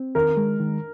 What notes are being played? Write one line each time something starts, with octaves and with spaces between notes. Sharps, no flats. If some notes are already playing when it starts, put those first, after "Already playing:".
Already playing: C4
D#3 A#4
G#3
D#3